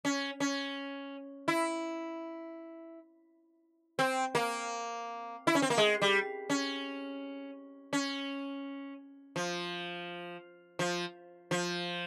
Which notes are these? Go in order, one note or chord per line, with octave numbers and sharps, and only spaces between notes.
C#4
C#4
E4
C4
A#3
E4
C#4
C4
A#3
G#3
G3
C#4
C#4
F3
F3
F3